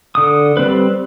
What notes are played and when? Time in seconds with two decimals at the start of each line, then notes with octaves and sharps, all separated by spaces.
0.15 D3 D#6
0.57 G3 C4 B4